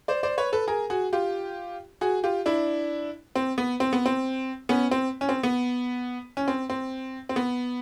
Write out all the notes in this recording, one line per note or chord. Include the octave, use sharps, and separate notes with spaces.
C5 D5
C5 D5
B4 C#5
A4 B4
G#4 A#4
F#4 G#4
F4 G4
F#4 G#4
F4 G4
D4 E4
C4
B3
C4
B3
C4
B3 C#4
C4
C#4
C4
B3
C#4
C4
C4
C4
B3